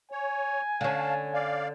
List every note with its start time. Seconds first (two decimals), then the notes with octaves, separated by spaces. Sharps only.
0.12 C#5 G#5
0.81 D3 C#4 F5 A5
1.34 D5 F5